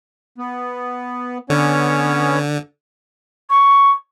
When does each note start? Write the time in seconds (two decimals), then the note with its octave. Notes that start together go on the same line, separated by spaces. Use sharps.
0.38 B3
1.50 D3 B3 C#4 C#5
3.50 C#6